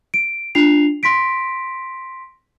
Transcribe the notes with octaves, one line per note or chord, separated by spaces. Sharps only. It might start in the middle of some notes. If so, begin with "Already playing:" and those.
D7
D4 F4 C7 F7
C6 A#6 B6 D7